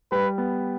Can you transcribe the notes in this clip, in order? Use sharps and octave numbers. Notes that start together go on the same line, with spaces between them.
G3 B4
B3